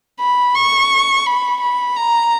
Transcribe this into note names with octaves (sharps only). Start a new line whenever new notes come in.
B5
C#6
B5
B5
A#5